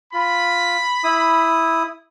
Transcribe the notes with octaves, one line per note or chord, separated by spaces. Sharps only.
F4 B5
E4 D#6